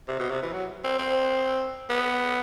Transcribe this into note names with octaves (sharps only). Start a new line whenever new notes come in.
C3
B2
C3
E3
F#3
C4
C4
B3